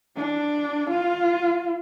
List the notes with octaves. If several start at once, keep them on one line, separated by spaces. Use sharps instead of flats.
D4
F4